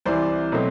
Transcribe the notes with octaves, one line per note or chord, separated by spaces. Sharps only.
C2 C3 E3 C5 D5
B2 F#3 A3 C4